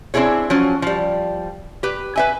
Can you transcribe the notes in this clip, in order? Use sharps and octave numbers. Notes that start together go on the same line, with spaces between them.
C4 D4 E4 G#4 C#5
F3 F#3 C#4
F3 G3
G4 B4
B4 E5 G#5